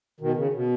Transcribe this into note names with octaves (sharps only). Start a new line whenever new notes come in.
B2 D#3
C#3
B2